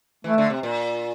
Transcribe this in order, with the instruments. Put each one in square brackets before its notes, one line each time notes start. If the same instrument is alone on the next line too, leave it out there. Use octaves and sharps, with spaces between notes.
[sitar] E3 [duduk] A3
[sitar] D3
C3
A#2